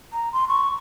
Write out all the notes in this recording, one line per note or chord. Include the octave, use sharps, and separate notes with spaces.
A#5
C6
C#6